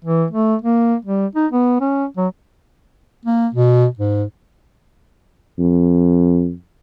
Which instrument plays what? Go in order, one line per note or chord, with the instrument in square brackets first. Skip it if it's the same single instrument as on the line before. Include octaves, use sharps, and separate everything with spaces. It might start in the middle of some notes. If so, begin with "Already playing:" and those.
[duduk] E3
A3
A#3
G3
D#4
B3
C#4
F#3
[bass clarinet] A#3
B2
G#2
[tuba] F2